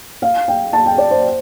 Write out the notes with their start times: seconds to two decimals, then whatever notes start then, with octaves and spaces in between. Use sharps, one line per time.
0.22 F5
0.48 G5
0.73 A5
0.86 G5
0.98 D5
1.11 C5